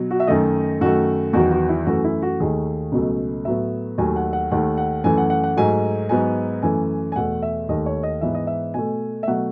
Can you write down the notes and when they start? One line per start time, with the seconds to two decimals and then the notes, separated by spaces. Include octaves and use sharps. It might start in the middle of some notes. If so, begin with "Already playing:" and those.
Already playing: B2 F#3
0.11 F#4
0.20 E5
0.27 F#2 D#3 A3 D#5
0.81 F#2 D#3 A3 F#4
1.33 E2 D#3 F#3 B3 F#4
1.51 F#4
1.69 E4
1.86 F#2 E3 A3 F#4
2.04 E4
2.22 F#4
2.40 D#2 D#3 A3 G#4
2.92 C#2 B2 F#3 A3
3.45 A2 F#3 B3 E5
3.98 D#2 D#3 F#3 A3 G#5
4.16 F#5
4.33 F#5
4.51 D#2 D#3 A3 F#5
4.78 F#5
5.04 F#2 E3 A3 G#5
5.18 F#5
5.30 F#5
5.44 F#5
5.57 G#2 F#3 A3 G#5
6.09 G#2 F#3 B3 G#5
6.62 F#2 E3 A3 G#5
7.12 G#5
7.16 E2 B2 A3 F#5
7.42 E5
7.69 D#2 D#3 A3 D#5
7.86 C#5
8.03 D#5
8.21 G#2 E3 B3 E5
8.35 D#5
8.47 E5
8.74 B2 A3 G#5
9.23 E5
9.27 B2 F#3 A3 F#5